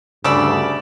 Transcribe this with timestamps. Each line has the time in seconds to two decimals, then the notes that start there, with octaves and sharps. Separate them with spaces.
0.24 D2 G2 C#3 A4 D5 B5